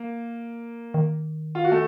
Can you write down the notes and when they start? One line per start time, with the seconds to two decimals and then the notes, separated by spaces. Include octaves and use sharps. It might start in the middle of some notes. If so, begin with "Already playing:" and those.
Already playing: A#3
0.94 D#3
1.55 F4
1.64 F#4
1.72 A3